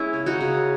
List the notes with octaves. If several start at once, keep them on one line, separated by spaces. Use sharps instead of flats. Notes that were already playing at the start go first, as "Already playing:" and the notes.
Already playing: G#3 B3 C#4 E4
C#3
D#4 F#4
C#3